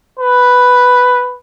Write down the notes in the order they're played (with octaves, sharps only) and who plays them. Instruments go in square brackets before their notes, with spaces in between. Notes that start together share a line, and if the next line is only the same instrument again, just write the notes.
[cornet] B4